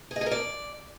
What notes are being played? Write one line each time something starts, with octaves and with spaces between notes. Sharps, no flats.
G#4
D#5
G#4
A#4
D5